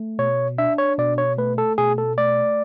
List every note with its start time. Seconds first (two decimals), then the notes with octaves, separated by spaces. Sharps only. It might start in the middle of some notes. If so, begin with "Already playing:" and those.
Already playing: A3
0.19 B2 C#5
0.58 D4 E5
0.78 C#5
0.98 B2 D5
1.18 C#5
1.38 A3 B4
1.58 A4
1.78 B2 G#4
1.98 A4
2.18 A3 D5